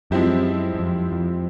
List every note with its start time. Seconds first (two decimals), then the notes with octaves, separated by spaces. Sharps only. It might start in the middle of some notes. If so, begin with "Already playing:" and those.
0.11 F#2 F3 G#3 C4 E4 G4
0.75 F#2
0.79 F2
1.12 F2